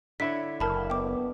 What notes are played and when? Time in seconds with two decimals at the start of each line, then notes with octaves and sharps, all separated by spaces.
0.20 D3 E4 C#5 B6
0.60 F#1 A#4 A5 B5
0.90 B3 G5 D6